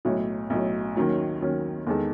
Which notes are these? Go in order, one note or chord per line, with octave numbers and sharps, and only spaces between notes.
B1 A2 F#3
B1 A2 F#3
D#2 D#3 F#3 C#4
D#2 D#3 F#3 C#4
E2 D#3 G#3 D#4 A4